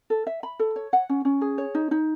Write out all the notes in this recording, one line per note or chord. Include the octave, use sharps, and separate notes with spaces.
A4
E5
B5
A4
C#5
F#5
C#4
C#4
G#4
C#5
D#4
D#4